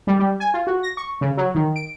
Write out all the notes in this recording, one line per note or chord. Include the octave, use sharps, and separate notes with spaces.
G3
G3
G#5
F4
F#4
A#6
C#6
C#3
F#3
D#3
D7